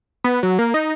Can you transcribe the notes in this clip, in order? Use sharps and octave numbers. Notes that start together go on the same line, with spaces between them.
B3
F#3
A#3
D#4